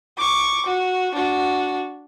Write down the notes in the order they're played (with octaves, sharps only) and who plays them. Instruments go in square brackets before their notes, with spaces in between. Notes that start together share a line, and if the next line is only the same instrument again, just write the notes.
[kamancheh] C#6 D6
F#4
D4 F#4